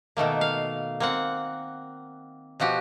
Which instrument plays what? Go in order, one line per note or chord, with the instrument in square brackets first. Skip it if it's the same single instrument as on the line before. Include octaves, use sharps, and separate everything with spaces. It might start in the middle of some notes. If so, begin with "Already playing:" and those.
[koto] B2 D#3 A3 A#3
F5
A#3 C4 F#5
B2 F3 F#4 G4